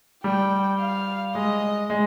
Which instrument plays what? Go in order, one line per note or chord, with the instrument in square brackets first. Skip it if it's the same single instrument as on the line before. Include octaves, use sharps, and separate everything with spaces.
[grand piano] G3 [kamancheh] G5
[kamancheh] F5
[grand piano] G#3 [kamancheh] D#5
[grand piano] G#3